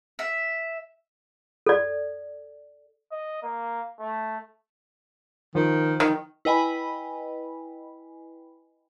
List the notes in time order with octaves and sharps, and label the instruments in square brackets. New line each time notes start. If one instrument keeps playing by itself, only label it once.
[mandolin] E5
[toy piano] A4 D5
[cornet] D#5
A#3
A3
[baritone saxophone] D#3 [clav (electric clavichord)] F3
[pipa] D#3
[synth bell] E4 B4 D#5 G5 G#5 B5